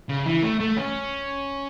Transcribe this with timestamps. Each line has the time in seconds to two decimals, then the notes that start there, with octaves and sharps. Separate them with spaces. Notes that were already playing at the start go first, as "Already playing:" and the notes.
0.09 C#3
0.26 E3
0.43 A3
0.60 A3
0.77 C#4